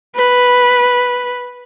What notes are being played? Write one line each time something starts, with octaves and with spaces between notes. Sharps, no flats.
B4